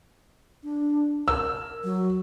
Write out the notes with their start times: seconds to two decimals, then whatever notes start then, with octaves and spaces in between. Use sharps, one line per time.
0.64 D4
1.28 A#4 E6
1.84 F#3